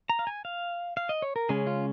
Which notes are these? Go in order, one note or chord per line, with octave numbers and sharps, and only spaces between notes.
A#5
F5
G#5
F5
F5
D#5
C#5
A#4
C#3 G#3 C#4 G#4
F4